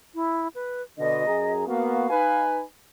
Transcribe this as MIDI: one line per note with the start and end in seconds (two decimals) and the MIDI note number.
0.15 0.48 64
0.55 0.82 71
0.98 1.26 47
0.98 1.26 50
0.98 1.53 75
1.27 1.67 42
1.27 1.67 68
1.27 1.67 82
1.67 2.09 58
1.67 2.09 59
1.67 2.09 66
1.67 2.44 77
2.10 2.63 63
2.10 2.63 71
2.10 2.63 80